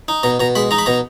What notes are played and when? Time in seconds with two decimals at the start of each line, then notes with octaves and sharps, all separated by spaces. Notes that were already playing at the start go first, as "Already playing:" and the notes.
0.08 D#4
0.23 B2 A#5
0.40 B2 A#5
0.55 G#3 B5
0.71 D#4 A#5
0.78 B5
0.86 B2 A#5